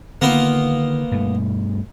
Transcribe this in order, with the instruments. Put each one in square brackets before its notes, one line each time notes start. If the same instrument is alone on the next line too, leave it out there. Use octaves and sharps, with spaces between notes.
[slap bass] D3 D#3 [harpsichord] A#3 B3 F4
[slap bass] G2 B2 A3